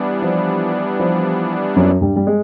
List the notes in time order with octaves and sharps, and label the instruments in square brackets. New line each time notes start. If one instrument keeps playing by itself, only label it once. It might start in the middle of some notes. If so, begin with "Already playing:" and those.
Already playing: [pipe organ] E3 G3 B3 D4
[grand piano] F3
F3
F#2 F#3
G2 G3
G3
G#3